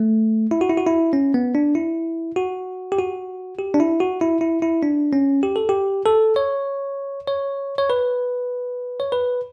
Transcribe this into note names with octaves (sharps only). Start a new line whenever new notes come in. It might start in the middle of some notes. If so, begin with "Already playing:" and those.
Already playing: A3
E4
F#4
E4
F#4
E4
C#4
B3
D4
E4
F#4
G4
F#4
G4
D4
E4
F#4
E4
E4
E4
D4
C#4
G4
A4
G4
A4
C#5
C#5
C#5
B4
C#5
B4